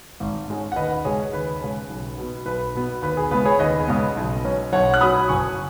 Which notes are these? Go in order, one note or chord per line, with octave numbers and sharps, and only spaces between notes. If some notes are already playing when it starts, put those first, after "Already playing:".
G#1
G#2 G#3 C#4
F#5
D#2 B4 D#5
C#3 G#3 C#4 G#4 C#5
D#2 B4
C#3 G#3 C#4
B1
B2 B3
B1 B4
B2 B3
D#2 B4
G#4
C#3 G#3 B3 B4
G#4 C#5
D#2 B4 D#5
C#3 G#3 B3
B1
B2 F#3 C#4
B1 C#5 F#5
F#6
B2 F#3 C#4 B5 D#6
F#1 G#5 C#6